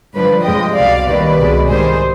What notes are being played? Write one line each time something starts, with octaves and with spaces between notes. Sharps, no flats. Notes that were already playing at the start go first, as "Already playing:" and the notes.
G2 D3 F3 B4 D5
F2 C3 F3 G#3 D#5 G5
C2 B2 G3 D5 F5
D#2 D#3 G3 B4 D5
C2 B2 G#3
G#2 D#3 G3 G#4 C5